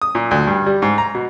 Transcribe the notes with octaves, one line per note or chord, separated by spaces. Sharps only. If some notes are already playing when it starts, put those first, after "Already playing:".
D#6
A#2
D2
G2
G3
G#2
A#5
B2